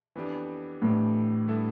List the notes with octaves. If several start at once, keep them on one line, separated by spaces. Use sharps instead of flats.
F2 E3 B3 D4 G4
F2 A2 E3 B3 D4 G4
D3 G3 B3 E4 A4